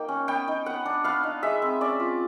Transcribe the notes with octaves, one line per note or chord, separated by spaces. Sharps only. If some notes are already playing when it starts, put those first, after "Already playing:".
Already playing: A#3 D#4 G5
C#4
B3 G5
D#4
B3 F#5
D4
B3 F5
D#4
G#3 E5
C4
C#4 D5
F4